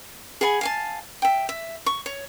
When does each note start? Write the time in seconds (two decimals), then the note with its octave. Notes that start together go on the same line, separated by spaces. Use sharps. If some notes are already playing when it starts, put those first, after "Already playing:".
0.41 G#4 F#5 G#5 B5
0.61 F5 G#5 A5
1.22 E5 G5
1.49 E5
1.86 C#6
2.06 C#5